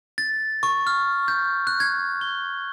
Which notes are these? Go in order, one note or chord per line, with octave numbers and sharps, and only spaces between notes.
A6
C#6
F6
G6
F#6
G#6
G7